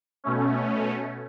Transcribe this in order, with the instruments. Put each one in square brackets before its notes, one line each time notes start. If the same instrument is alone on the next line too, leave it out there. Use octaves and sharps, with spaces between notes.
[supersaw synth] B2 A3 C#4